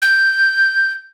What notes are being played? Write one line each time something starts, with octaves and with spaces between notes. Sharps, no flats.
G6